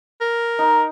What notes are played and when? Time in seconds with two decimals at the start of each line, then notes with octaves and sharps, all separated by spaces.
0.21 A#4
0.59 D#4